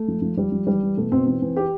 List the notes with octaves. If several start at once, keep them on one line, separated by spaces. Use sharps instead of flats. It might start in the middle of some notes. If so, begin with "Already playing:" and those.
Already playing: A3
F3
F3
F3 G3
F3
E3 G3
E3
B2 A3
B2 C4
E3 C4
E3
G4